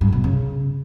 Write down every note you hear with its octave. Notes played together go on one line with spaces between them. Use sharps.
G2
B2
C#3